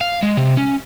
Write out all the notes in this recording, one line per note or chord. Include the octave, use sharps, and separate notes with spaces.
F5
G#3
C3
C#4